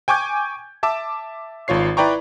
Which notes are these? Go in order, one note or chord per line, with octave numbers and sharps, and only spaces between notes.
G5 G#5 C#6 D6 G6 G#6
E5 A5 D6 E6
G#1 F4 C#5 C7
E4 B4 D5 G5 A#5 C#6